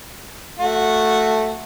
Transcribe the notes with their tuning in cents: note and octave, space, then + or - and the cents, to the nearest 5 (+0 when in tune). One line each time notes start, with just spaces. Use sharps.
A3 +0 F#4 -10